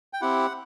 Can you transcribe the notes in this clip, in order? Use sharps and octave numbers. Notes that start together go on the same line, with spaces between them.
G5
C4 E4 G4 F#5